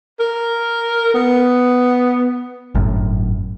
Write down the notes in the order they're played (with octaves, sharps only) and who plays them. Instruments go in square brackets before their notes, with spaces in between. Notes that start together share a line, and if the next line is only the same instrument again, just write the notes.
[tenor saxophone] A#4
B3
[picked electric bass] G1 F#2 A2